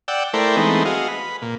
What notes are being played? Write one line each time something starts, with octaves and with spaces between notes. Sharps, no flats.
D5 F#5 G5 E6
A3 E4 A#4 C5 D5 G5
E3 G#3 A3 B3 C4 D#4
F#4 G#4 D#5 F5
B4
A#2